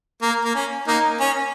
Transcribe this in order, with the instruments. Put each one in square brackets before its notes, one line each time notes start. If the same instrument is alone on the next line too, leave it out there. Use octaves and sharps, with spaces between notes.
[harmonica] A#3
A#3
C#4
A#3 D#4
C#4